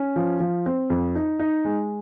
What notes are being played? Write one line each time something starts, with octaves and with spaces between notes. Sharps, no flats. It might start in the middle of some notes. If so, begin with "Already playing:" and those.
Already playing: C#4
F3
F3
C4
F2
D#4
D#4
G#3